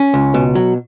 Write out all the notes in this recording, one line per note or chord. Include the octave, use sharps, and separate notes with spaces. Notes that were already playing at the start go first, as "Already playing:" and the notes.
Already playing: C#4
C#2
B2
F#3